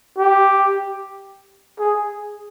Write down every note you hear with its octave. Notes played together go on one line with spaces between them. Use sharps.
G4
G#4